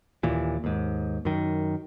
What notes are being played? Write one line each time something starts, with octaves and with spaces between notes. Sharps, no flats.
D#2 A#2 E3
D#2 G#2
F#2 D#3